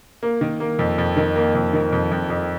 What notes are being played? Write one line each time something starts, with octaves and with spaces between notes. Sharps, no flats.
A#3
D#3
A#3
F2
F2
D#3
A#3
F2
D#3
F2
F2
F2